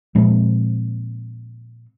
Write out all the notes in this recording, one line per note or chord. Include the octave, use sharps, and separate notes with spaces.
A#2 F3 G#3 C4